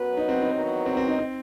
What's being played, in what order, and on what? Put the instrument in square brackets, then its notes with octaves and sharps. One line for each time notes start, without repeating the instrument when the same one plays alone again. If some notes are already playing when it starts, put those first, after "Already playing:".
Already playing: [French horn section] F#2 F#3 B3 F#4 B4
[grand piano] D#4
C4
D#4
[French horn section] E2 D#3 F#3 B3 F#4
[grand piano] C4
C4
D#4
C4